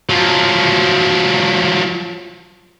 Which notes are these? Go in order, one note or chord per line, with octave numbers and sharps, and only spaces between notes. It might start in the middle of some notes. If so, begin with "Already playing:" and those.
F3 F#3